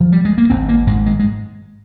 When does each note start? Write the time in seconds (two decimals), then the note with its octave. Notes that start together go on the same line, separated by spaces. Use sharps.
0.01 F3
0.12 G3
0.25 G#3
0.38 A#3
0.50 G#1 C4
0.69 A#3
0.87 G#2 G#3
1.06 G#3
1.19 G#3